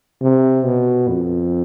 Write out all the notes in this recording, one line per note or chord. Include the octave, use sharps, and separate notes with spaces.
C3
B2
F2